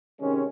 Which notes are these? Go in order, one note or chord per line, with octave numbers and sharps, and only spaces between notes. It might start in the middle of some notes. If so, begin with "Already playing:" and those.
C3 D#3 G#3 C#4